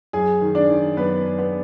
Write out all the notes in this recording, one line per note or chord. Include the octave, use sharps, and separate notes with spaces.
F#2 G#4 G#5
D#3
D4 D5
D#3
F#2 B3 B4
F#2
B3 B4